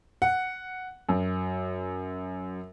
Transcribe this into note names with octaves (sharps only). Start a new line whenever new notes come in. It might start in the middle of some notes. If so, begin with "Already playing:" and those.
F#5
F#2